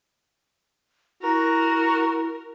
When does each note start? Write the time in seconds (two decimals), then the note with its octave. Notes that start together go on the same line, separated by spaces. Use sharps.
1.23 E4 F#4 A#4 A#5